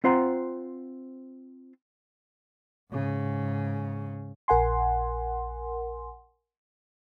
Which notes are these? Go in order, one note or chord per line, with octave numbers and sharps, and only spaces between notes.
C4 F4 C5 F#5 A#5 C6
G#2 C#3
A#1 A#4 F#5 G#5 C6